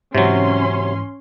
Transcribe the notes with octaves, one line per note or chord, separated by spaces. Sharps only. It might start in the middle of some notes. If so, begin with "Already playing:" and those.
G#2 C3 E3 F#3 C#4 C6